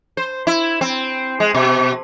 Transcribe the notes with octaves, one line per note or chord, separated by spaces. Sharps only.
C5
E4
C4
G#3
B2